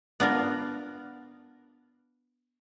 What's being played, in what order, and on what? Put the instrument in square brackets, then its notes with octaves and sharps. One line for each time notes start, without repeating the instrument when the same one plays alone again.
[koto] B3 D4 F4 A#4